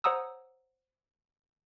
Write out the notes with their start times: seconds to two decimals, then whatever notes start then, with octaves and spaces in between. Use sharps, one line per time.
0.04 C5 C#5 F#5 A#5 D#6 E6